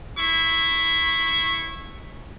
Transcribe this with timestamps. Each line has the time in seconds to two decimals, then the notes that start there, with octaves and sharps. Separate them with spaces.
0.17 E4 B5 C#6